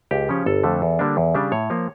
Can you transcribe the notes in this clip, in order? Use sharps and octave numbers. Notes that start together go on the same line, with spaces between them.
C#2 G4
C#3 F3 C#4
G1 A4
F2 D3 A3
E2
D3 G3 A#3 D4
E2
C#3 G3 D4
A2 C#5
F3 A#3